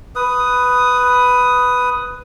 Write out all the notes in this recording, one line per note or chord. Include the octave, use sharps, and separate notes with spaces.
B4 D#6